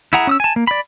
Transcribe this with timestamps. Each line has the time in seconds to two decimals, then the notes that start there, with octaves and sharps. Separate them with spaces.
0.13 E4 G#4 F#5 A#5
0.27 C#4 D#6 E6
0.40 G#5 A5
0.56 A#3
0.67 D5 B5